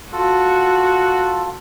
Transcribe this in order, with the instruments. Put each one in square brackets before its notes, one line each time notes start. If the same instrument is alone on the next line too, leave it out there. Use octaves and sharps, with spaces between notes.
[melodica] F4 A4 [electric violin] F#4